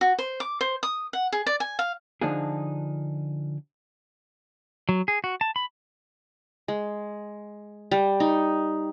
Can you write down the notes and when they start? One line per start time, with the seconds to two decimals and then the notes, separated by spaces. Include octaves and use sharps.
0.01 F#4
0.18 C5
0.40 D6
0.61 C5
0.83 D#6
1.13 F#5
1.32 G#4
1.46 D5
1.60 G#5
1.79 F5
2.21 D3 F3 D4 D#4 F4 G#4
4.89 F#3
5.08 G#4
5.24 F#4
5.41 A5
5.56 B5
6.68 G#3
7.91 G3
8.20 D#4